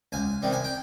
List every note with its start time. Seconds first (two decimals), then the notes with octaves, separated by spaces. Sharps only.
0.12 C#2 G#5
0.42 C3 D#3 G3
0.53 G#5
0.64 G5